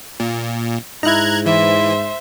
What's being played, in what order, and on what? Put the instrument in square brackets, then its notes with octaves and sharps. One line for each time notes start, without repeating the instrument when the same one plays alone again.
[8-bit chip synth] A#2
[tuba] G#2 [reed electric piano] D#4 E4 [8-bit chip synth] A#5 F#6 G#6
[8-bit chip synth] E3 [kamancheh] C5 E5